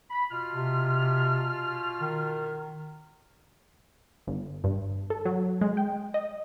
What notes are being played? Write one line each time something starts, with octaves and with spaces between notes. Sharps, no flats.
B5
B2 F4 F6
C3
D#3
G1
G2
A4
F#3
G#3
G5
D#5